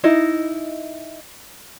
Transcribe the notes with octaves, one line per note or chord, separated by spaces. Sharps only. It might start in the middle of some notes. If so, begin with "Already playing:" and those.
D#4 E4 D#5